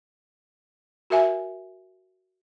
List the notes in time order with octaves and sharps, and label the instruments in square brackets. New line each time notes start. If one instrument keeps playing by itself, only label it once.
[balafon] F#4 A#4 E5 G#5